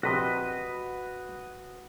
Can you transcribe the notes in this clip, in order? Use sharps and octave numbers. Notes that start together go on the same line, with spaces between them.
A#1 C3 F#4 B4 D#5